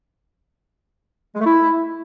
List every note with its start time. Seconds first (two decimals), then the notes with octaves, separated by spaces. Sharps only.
1.35 G#3
1.41 A3
1.46 E4